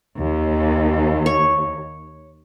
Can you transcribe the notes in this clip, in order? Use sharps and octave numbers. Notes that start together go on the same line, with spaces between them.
D#2
C#5